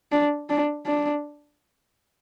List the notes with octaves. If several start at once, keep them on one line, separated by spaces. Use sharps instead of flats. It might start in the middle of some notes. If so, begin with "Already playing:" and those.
D4
D4
D4